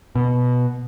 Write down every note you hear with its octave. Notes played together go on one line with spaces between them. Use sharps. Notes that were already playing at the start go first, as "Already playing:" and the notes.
B2